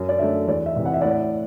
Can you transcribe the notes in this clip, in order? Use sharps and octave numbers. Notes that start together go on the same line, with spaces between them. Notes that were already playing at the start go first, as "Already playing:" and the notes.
Already playing: F#2
D5
D3 A3 E5
E2 D5
E5
C3 E3
F#5
E5
A2 D5 F#5